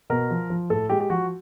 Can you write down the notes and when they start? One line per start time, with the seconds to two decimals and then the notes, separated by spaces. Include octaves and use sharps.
0.10 B2 A#4
0.31 F3
0.50 F3
0.70 A2 A4
0.89 G#3 G4
1.00 G4
1.10 F3 F#4